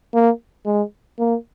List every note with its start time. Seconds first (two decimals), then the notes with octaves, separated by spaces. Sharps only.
0.14 A#3
0.66 G#3
1.19 A#3